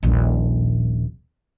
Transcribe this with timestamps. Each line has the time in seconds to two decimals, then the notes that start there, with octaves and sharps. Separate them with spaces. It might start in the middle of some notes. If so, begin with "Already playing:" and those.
0.03 D#1 A#1